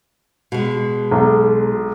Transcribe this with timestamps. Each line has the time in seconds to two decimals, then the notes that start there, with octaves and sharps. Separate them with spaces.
0.52 B2 G#3
1.11 B1